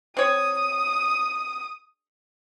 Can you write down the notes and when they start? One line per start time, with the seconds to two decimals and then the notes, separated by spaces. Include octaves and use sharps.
0.17 C4 C#5 D#6